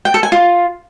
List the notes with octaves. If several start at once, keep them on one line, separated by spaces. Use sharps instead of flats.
G5
A4
G#5
F4